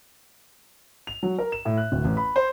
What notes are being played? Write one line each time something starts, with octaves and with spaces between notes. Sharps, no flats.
F7
F#3
A#4
E7
A2
F#6
D1
A1
B5
C5